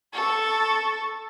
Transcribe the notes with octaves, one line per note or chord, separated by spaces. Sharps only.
A4 C#6